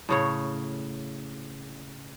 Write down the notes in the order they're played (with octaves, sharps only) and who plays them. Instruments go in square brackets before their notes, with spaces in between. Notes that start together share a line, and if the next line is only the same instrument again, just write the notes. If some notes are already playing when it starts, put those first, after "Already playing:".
[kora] A2 C#3 C#5